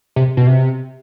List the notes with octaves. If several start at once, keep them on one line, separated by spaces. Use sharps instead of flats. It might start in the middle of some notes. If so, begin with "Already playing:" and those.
C3
B2
C3